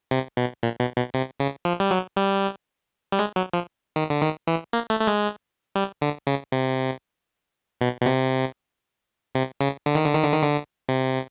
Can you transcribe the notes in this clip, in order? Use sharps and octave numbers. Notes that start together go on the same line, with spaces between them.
C3
B2
A#2
B2
B2
C3
C#3
F3
G3
F#3
G3
G3
G#3
F#3
F3
D#3
D3
D#3
E3
A#3
A3
A3
G#3
G3
D3
C#3
C3
B2
B2
C3
C3
C#3
D3
D#3
D3
D#3
D3
D#3
D3
C3